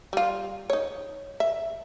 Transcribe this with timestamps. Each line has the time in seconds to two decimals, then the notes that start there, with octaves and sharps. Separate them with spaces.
0.13 G3 F4
0.70 D#4 C#5
1.40 E5